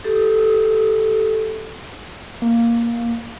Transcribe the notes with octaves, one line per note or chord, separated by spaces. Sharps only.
G4 A4
A#3